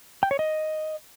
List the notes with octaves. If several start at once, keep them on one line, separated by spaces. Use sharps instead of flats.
G5
C#5
D#5